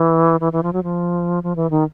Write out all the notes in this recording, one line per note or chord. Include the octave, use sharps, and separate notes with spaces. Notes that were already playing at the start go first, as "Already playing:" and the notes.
Already playing: E3
E3
E3
F3
F#3
F3
F3
E3
D#3